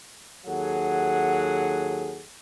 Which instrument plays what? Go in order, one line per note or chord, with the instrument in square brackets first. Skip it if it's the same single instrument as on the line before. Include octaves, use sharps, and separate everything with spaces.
[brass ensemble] D#2 F#3 G#4 A4 F#5